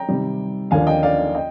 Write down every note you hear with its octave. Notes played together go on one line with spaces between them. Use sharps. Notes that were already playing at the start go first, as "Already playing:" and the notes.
Already playing: G5 A#5
C3 D#3 G3
D#2 D3 F3 A#3 D4 F5 G#5
D#5 G5
D5 F5
D#5 G5